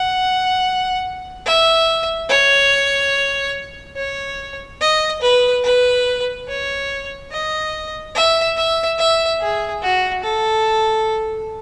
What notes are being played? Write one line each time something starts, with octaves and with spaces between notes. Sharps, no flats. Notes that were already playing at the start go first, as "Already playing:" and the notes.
Already playing: F#5
E5
C#5
C#5
D#5
B4
B4
C#5
D#5
E5
E5
E5
G#4
F#4
A4